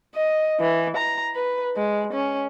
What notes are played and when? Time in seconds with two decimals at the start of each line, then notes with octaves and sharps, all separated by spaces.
0.15 D#5
0.60 E3
0.97 A#5
1.35 B4
1.77 G#3
2.13 C#4